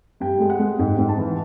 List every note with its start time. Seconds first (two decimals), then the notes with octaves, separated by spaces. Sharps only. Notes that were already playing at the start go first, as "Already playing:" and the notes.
0.20 G2 G5
0.40 G#3
0.50 F#5
0.59 G#3
0.79 G#2 G5
0.98 G#2
1.09 A5
1.18 E3